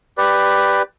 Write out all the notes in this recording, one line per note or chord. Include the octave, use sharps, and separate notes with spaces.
G4 B4 D5